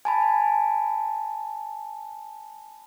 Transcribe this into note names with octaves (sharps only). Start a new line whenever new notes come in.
G#5 A5 B5